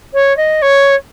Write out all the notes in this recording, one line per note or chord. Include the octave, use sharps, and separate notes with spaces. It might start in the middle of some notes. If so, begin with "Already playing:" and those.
C#5
D#5
C#5